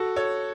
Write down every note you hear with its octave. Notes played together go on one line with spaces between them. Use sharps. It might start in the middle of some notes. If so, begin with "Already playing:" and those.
Already playing: F#4 A4
A4 C#5